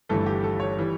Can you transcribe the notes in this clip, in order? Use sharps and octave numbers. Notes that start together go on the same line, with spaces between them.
G1 G2 E3 A3 A4
G4
A4
C#5
E3 G3